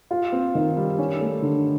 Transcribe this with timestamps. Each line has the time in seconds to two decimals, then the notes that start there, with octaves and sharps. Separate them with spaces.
0.11 F4
0.32 C4
0.55 D#3
0.77 G3
0.99 C#4
1.21 A3
1.42 D3